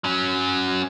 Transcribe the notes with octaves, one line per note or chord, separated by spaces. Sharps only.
F#3 C#4